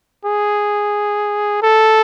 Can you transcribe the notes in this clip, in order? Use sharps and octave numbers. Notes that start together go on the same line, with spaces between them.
G#4
A4